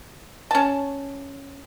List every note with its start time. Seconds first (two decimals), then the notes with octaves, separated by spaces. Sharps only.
0.51 C#4 A5